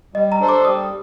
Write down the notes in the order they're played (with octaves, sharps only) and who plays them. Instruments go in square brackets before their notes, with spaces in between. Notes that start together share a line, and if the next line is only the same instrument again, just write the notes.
[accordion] G3 [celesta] D#5
[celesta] A#5
[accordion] D4 A4 C5
[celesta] D6
[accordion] G3 [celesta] D#6